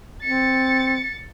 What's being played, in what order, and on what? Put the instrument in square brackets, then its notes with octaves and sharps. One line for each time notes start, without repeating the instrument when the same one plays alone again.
[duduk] C4 [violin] A6 C#7